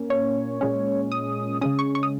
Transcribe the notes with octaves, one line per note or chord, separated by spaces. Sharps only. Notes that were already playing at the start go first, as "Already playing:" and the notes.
Already playing: A#2 A#3 C#4
C#5
A#2 G#3 C#4
D#6
C#3 G#3 C#4 D#6
C#6
C#6
D#6